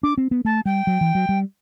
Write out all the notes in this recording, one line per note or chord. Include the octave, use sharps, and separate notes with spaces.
D4 D6
C4
B3
A3 A5
G3 G5
F#3
E3
F#3
G3